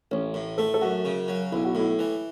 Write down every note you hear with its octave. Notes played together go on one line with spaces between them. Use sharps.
A1 C#4
A2
A3 A4
A4
F#2 F#4
C#3
F#3
B1 E4
F#4
A2 E4
E3